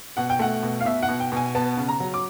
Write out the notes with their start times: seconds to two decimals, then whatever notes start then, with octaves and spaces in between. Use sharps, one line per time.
0.17 B2 F#5
0.30 G5
0.39 A3 F#5
0.63 B2
0.81 F5
0.85 B2 E5
1.03 F#5
1.08 B2
1.20 G5
1.32 B2 G#5
1.55 B3 A5
1.77 C#3
1.88 A#5
2.00 F#3
2.14 D6